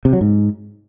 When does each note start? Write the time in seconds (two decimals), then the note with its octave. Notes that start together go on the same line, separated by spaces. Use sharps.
0.05 C3
0.13 F#3
0.21 G#2